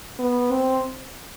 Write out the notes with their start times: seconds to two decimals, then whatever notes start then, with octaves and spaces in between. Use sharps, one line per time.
0.19 B3
0.51 C4